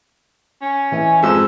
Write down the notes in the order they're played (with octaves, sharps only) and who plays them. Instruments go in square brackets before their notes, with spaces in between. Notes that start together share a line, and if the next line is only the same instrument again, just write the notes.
[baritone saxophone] C#4
[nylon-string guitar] E3 D#5 G#5
[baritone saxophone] F2 [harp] G#2 G4 E6